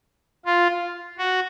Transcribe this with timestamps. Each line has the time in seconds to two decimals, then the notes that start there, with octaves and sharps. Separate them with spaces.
0.45 F4
1.18 F#4